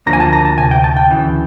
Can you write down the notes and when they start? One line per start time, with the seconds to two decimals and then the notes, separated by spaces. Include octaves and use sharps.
0.06 D2 D3 F3 A#3 D4 A#5
0.13 G#5
0.20 A5
0.33 A#5
0.45 A5
0.58 D2 C3 G#5
0.71 G5
0.84 A5
0.96 G5
1.10 D2 C#3 E3